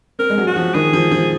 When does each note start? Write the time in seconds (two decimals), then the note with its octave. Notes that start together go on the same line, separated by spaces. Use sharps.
0.19 C4 A#4
0.30 G#3
0.38 F#3
0.47 F#4
0.56 F3
0.74 D#3 G#4
0.93 F3
1.12 F3